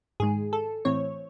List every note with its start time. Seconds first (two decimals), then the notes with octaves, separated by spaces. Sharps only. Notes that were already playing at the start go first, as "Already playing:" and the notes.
0.20 G#2 D#3 G#3 G#4
0.53 A4
0.85 A2 E3 C4 C#5